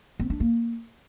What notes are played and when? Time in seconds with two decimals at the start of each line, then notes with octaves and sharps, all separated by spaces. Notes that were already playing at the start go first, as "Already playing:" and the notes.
0.20 C4
0.30 D4
0.40 A#3